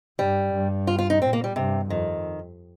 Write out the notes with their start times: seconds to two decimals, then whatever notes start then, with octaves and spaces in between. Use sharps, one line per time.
0.19 G2 G3
0.53 G2
0.87 F4
0.99 F4
1.10 D#4
1.22 A#2 C4
1.33 A#3
1.44 G3
1.55 G2 C3
1.90 F2 D#3